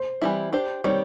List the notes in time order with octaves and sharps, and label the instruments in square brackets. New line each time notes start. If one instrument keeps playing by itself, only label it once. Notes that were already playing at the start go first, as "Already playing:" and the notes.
Already playing: [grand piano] C5
[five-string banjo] E3 G3 C4 E4
D4 G4 C5
[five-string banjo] D#3 G3 C4 [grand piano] C#5